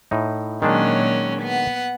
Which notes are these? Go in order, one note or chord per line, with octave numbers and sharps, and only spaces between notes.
A2 D#4
A#2 D#3 F#3 G#3 C#4 D4
B3 F#5